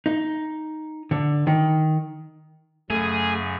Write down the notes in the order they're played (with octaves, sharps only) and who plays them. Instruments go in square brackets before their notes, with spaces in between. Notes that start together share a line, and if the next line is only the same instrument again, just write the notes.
[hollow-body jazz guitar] D#4
D3
D#3
[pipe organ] F#2 C#3 [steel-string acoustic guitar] A3 [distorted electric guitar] G#4